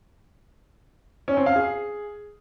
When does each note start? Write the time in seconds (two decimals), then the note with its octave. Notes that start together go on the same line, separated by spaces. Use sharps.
1.28 C#4
1.37 C4
1.46 F5
1.56 G#4